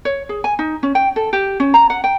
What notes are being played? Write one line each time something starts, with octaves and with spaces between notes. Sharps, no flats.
C#5
G#4
G#5
D#4
C#4
G5
A4
G4
C#4
A#5
F#5
G5